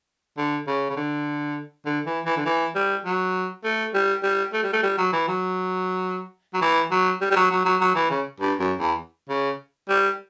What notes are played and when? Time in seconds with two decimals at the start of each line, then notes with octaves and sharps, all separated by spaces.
0.37 D3
0.67 C#3
0.90 C#3
0.96 D3
1.85 D3
2.06 E3
2.25 E3
2.37 D3
2.45 E3
2.75 G3
3.05 F#3
3.64 A3
3.94 G3
4.23 G3
4.53 A3
4.63 G3
4.73 A3
4.83 G3
4.98 F#3
5.13 E3
5.28 F#3
6.54 F#3
6.61 E3
6.91 F#3
7.21 G3
7.31 G3
7.36 F#3
7.51 F#3
7.65 F#3
7.81 F#3
7.95 E3
8.10 C#3
8.40 G2
8.59 F#2
8.79 E2
9.29 C#3
9.89 G3